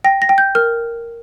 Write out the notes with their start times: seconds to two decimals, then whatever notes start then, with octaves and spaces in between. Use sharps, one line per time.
0.04 G5 A#6
0.22 A#6
0.29 G5
0.38 G6
0.55 A#4 F6